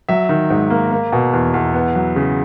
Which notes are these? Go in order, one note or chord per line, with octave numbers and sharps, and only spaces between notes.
F#3 E5
D#3
G#2
A#3
A#3
B2
E2
E2
B3
F#3
C#3